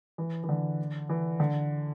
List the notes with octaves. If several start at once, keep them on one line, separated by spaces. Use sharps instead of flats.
E3
E3
D3
E3
D3